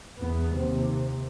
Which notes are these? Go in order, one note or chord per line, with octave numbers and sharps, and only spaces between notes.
E2 B3
D#2 C3